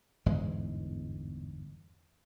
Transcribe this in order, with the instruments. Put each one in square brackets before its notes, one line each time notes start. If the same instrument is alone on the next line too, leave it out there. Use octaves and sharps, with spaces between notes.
[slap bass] G1 E2 G#2 G#3